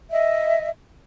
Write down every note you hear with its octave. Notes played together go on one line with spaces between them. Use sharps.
D#5 E5